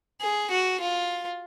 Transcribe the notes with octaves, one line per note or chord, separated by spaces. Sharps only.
G#4
F#4
F4